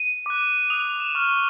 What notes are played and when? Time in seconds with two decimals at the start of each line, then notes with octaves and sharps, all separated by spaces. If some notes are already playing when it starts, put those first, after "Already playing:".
Already playing: D#7
0.26 D6 F#6
0.70 D#6 F#6 F7
0.86 F7
1.00 E7
1.15 C#6 F6